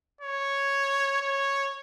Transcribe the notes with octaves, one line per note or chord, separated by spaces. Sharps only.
C#5
C#5